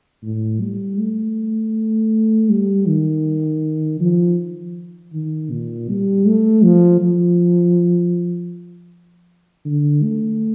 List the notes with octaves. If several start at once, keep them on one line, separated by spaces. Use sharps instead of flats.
A2
G3
A3
G3
D#3
F3
D#3
A#2
G3
A3
F3
F3
D3
A3